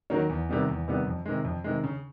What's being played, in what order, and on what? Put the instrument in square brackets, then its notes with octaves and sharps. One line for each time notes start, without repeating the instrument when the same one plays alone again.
[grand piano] D#3 F#3 A#3 C#4
E2
C3 D#3 G3 B3
E2
C3 D#3 G3 B3
F2
C3 D#3 G#3
F2
C3 D#3 G#3
C#3